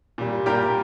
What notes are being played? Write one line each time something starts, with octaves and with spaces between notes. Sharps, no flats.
A#2 G3
A#2 G3 G4 A#4